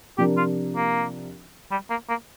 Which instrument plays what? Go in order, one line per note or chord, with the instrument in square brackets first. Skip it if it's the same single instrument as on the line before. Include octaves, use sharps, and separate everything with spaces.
[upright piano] C3 F3 D4 A#4 [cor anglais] G4
[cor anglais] F4
A#3
G3
A#3
A#3